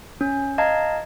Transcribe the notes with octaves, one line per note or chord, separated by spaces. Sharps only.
C#4
D#5 F5 A5 A#5 G#6